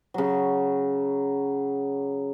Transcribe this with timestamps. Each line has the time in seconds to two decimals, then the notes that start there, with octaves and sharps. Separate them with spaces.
0.14 C#3 F#3